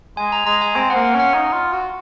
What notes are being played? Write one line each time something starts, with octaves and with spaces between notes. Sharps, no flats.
G#3 G#5
A#5
G#3 A#5
G#5
C4 G#5
F#5
A#3 F5
F#5
C#4
F#5
D#4
F4
F#4